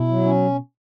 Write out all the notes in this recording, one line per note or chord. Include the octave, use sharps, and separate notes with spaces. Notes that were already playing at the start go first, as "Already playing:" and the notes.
Already playing: B2 E4
F#3
C#4